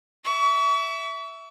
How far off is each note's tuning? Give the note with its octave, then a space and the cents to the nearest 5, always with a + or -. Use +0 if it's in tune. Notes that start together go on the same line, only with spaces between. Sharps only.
E5 +0 C#6 +40